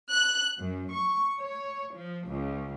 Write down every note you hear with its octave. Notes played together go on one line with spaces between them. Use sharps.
F#6
F#2
C#6
C#5
F3
C#2